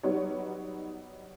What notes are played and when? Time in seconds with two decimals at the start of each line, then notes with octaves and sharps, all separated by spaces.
0.03 F#3 G3 B3 D#4 C#5